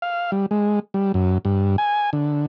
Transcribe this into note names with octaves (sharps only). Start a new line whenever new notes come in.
F5
G3
G#3
G3
F#2
G2
G#5
D3